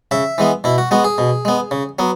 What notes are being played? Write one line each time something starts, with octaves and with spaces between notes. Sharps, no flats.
C#3 E5
E3 G#3 B3
B2 E4
F#4
G#3 B3 F#4
G#4
B2
G#3 B3
C#3
F#3 B3